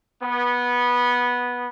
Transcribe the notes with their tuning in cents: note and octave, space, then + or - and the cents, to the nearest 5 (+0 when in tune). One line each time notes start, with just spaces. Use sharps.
B3 -15